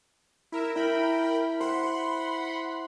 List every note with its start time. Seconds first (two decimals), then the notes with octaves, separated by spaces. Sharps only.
0.52 E4 A#4 E5
0.76 E4 A#4 G5 B5
1.60 C5 F#5 B5 C6